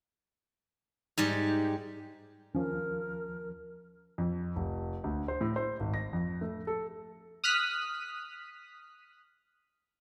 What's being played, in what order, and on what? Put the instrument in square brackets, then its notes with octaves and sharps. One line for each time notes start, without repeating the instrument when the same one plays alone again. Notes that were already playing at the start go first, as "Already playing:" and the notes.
[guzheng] G#2 G3 G4
[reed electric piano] D#2 F3 [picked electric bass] C#4 [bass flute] A#4
[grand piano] F2
F1
D2
C5
A2
C5
G#1
A#6
F2
A3
A4
[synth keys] D#6 F6 F#6 B6